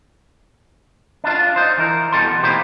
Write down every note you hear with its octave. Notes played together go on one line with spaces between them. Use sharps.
D4 F4
D#4 C5
E3 A#4
B2 G3 A4 C6
B2
A#3 D#4 E4 G4 C5